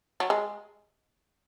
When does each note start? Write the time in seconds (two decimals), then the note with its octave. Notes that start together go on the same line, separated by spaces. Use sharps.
0.20 F#3
0.30 G#3